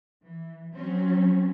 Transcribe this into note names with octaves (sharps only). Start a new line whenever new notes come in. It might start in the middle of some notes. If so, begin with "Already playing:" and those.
E3
F#3 C4 C#4